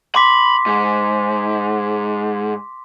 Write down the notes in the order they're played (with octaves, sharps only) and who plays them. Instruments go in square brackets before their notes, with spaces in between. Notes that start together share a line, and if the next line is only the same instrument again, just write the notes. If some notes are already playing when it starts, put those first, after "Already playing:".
[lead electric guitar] B5 [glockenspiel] C6 D6 B6
[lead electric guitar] G#2